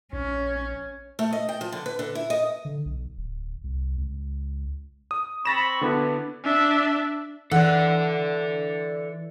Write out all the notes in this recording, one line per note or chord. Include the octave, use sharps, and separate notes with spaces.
A#1 C#4
A3
D#5
G5
F3
D3
B4
D3
E4
D#5
D3
B1
D1
C2
C#2
D#6
C4 B5 C#6 A6 A#6 E7
D3 B3 D4 E4 F#4 B4
D4 E5
E3 A4 D5 F#5